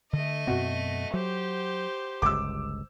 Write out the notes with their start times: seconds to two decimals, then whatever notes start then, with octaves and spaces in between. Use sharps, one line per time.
0.13 D3 A3 D#5
0.47 F#2 B2 C4 F#4
1.14 F#3 G4 C5
2.22 G1 C#2 D6 E6